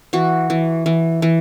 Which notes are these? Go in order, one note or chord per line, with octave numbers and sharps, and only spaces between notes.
E3 F#4
E3
E3
E3